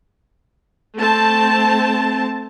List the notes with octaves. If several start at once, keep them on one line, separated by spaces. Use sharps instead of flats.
A3 C4 A5